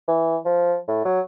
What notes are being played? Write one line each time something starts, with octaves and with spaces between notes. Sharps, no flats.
E3
F3
A2
F#3